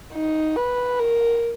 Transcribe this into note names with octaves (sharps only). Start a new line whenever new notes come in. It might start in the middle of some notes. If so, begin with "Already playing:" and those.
D#4
B4
A#4